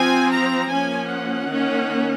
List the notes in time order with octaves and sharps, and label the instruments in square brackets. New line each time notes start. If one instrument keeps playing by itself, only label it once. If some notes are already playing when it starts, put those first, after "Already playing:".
Already playing: [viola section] F3 C4 G#5
A#5
F3 A#3 C#4 G#5
F#5
D#3 A#3 C#4